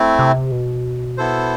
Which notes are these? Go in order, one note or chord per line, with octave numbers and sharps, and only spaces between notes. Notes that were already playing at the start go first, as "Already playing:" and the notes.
Already playing: A3 C4 E4
C3
B2
B3 E4 A4 C5